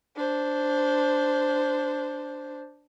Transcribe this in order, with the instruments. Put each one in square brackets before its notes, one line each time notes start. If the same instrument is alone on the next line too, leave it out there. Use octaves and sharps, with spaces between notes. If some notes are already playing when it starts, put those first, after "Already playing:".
[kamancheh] D4 C5